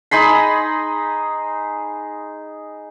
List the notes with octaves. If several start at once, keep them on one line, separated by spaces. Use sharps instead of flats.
D#4 G#4 B5 C6